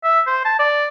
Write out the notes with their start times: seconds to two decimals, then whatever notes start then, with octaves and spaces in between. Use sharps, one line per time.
0.04 E5
0.27 C5
0.45 A5
0.59 D5